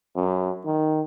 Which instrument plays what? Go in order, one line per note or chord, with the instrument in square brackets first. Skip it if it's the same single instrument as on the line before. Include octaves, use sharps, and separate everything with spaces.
[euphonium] F#2
D#3